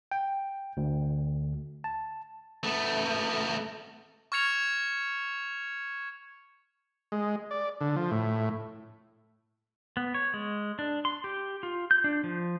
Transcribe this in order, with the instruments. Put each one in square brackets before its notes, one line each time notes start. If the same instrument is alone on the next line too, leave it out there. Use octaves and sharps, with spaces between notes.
[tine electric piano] G5
D2
A5
[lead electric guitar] A3 B3
[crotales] C#6 F6 G#6 C#7 F7
[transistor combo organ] G#3
D5
D3
F3
A2
[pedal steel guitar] B3
C#5
G#3
D4
C6
G4
F4
G6
D4
F3